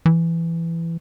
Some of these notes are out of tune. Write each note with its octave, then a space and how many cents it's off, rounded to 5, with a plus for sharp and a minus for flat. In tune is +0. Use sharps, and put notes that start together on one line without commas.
E3 +15